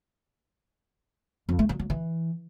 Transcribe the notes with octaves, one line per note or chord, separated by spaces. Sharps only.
F2
A3
F#3
F#3
E3